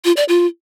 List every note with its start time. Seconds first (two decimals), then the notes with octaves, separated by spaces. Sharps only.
0.05 F4
0.17 D5
0.28 F4